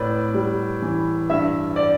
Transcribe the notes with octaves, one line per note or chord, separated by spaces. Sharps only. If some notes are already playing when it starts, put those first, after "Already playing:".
Already playing: A2 B4 D5
G3
E3
G2 E5
D5